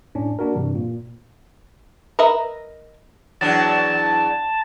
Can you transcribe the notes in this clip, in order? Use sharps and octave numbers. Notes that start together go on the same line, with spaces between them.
F#2 A2 C#4 D4
A#3 D4 F#4 A#4
G2 C3 E3 G3
A#2
A#4 B4 D#5 E5 A#5
E2 F#3 D4 A5